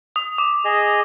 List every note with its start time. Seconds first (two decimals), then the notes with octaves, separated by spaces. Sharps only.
0.16 D#6
0.38 D6
0.65 G#4 D#5